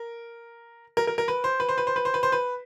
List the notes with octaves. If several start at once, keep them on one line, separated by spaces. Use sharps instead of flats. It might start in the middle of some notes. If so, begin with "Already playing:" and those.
Already playing: A#4
A#4
A#4
A#4
B4
C5
B4
C5
B4
C5
B4
C5
B4
C5
B4